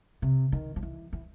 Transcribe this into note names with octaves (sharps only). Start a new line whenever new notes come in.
C3
D#3
F3
E3
E3